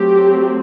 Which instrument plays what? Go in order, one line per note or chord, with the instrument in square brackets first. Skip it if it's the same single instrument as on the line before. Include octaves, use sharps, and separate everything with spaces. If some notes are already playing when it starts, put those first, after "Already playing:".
Already playing: [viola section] F#3 A3 C4 G4